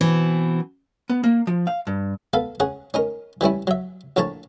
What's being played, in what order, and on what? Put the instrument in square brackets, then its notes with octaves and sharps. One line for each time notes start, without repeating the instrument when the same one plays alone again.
[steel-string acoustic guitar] B2 E3 C4
[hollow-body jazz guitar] B3
A#3
F3
F5
G2
[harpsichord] B3 A4 F5
C#4 G#4 F#5
C#4 D#4 A#4
E3 G3 C#4 E4
F#3 E5
A#1 A2 F3 C#5 A5 A#5